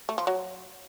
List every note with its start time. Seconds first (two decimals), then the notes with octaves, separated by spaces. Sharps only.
0.09 A3
0.18 F3
0.27 F#3